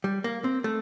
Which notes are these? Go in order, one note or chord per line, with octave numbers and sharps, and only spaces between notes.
G3
A#3
C4
A3